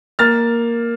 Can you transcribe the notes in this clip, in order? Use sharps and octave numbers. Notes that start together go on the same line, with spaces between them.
A#3 F6 A6